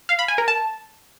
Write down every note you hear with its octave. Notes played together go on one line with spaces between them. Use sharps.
F5
B5
G#5
A#4
A5